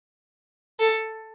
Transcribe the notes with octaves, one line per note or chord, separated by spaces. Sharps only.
A4